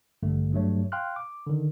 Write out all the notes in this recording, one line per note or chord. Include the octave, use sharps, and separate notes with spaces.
A1 G2 D3 A3
G2 F#3 A3 C#5
F5 G5 C6 F6 F#6
D6
D3 D#3